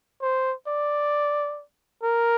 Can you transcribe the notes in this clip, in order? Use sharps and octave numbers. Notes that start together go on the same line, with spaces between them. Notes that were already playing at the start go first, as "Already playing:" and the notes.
C5
D5
A#4